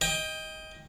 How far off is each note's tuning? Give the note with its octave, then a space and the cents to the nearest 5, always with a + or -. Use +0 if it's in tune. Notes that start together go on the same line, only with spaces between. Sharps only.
D#5 +15 G5 +25